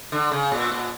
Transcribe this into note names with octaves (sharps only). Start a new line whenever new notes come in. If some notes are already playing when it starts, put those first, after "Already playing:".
D3
C#3
A#2
A#2